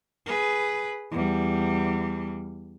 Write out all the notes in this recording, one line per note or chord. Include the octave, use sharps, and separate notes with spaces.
G#4 B4
E2 G3